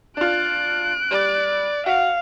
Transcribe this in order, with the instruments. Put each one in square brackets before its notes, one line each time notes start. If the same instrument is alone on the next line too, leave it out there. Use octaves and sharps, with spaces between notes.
[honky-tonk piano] D4 F4 [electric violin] F#6 D7
[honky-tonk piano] G3 [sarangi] D5
[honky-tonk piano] F#4 [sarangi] F5